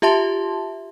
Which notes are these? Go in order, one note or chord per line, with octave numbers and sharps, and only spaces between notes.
F4 G4 E5 A5 C6